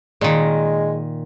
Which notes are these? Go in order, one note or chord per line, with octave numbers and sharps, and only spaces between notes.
A#2 D#3 G#3